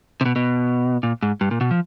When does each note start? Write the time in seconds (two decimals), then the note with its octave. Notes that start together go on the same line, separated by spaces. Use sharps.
0.21 C3
0.25 B2
0.36 B2
1.03 A#2
1.22 G#2
1.41 G2
1.51 A#2
1.61 B2
1.71 F3